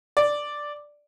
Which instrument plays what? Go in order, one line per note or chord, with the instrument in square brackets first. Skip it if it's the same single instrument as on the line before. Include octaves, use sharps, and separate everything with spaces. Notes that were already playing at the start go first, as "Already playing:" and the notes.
[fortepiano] D5